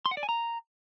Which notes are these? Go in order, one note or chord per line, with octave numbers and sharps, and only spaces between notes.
C6
F#5
D5
G#5
A#5